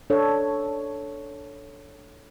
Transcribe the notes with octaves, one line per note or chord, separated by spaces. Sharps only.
D4 A4 C#5